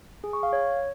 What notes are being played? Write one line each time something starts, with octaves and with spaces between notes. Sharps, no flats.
G#4
C#6
F5
C#5